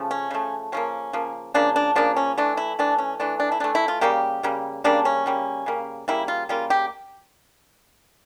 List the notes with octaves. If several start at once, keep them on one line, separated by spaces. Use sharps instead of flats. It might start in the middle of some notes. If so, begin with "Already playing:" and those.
Already playing: C#3 F3 A3
C#4
C#3 F3 A3
C#3 F3 A#3 C#4
C#3 F3 A#3
C#3 F3 A#3 D4
D4
C#3 F3 A#3 D4
C#4
E3 A3 D4
E4
E3 A3 D4
C#4
E3 A3 D4
D4
E4
E3 A3 D4
E4
F4
C#3 G3 A#3 G4
C#3 G3 A#3
C#3 G3 A#3 D4
C#4
C#3 G3 A#3
C#3 G3 A#3
C#3 G3 A#3 E4
F4
C#3 G3 A#3 F4
G4